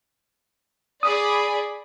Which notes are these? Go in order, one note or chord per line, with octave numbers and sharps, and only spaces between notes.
G#4 D5 B5 D#6